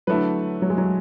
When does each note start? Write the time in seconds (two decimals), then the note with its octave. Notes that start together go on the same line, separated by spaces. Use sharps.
0.07 D3 F#3 A3 E4 B4
0.62 F#3
0.70 G#3
0.78 F#3